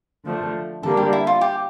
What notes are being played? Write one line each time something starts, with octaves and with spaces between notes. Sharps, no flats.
D3 F3 A3
D3 G3 A#3 D4 A4
G4
E4
F4
G4